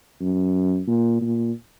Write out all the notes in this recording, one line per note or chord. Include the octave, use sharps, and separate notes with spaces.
F#2
A#2
A#2